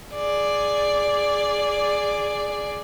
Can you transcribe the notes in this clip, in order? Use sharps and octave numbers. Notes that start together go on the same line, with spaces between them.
G#4 D5